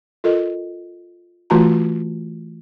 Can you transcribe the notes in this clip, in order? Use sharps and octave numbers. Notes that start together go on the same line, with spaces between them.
F4 A4 A#4 D#5
E3 A3 F4 F#4 A5 A#5